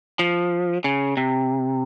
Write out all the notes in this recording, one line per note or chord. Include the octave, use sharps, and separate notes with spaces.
F3
C#3
C3